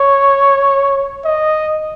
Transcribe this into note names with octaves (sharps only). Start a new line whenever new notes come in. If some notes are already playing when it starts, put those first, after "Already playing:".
Already playing: C#5
D#5